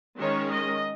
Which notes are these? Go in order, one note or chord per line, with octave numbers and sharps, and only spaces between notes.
D#3 G#3 C#4 C#5
D#5